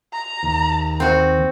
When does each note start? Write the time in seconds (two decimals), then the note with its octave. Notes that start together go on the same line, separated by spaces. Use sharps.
0.13 A#5
0.43 D#2
1.00 C4 F#4